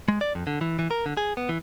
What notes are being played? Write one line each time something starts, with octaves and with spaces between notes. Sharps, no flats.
G#3
D5
F2
D3
E3
E3
A#4
D3
G#4
B3
E3